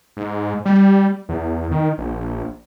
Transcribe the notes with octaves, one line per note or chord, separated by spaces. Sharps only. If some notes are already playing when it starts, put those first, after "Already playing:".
G#2
G3
E2
D#3
A#1